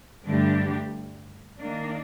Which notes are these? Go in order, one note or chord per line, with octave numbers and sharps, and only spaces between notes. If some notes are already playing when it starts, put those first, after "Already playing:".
G2 D3 A3 D4 G4
D#3 A#3 D4